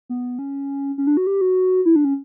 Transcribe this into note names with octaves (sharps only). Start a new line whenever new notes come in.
B3
C#4
C#4
D4
F#4
G4
F#4
E4
D4
C#4